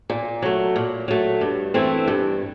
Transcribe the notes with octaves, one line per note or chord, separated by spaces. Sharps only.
A#2
F#3 A3
A#2
F#3 A3
G2
E3 A3 C4 E4
G2